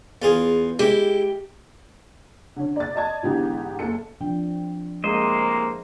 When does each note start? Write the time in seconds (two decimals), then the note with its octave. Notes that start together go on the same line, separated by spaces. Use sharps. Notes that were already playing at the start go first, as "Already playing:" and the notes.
0.22 E2 F4 G#4 F5
0.79 G#3 E4 G4
2.56 D3 C#4
2.76 D5 A6
2.95 D5 D#5 A5 G#6
3.23 G#2 D3 E3 B3 D#4 G4
3.79 F#1 A4 C#7
4.21 F3 D4 G5
5.04 A2 C3 G#3 A#3 G#4 C5 D#5